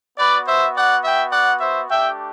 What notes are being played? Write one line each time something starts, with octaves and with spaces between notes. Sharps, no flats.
B3 F#4 B4 D5
C5 E5
D5 F#5
E5 G5
D5 F#5
C5 E5
A3 D4 G4 E5 G5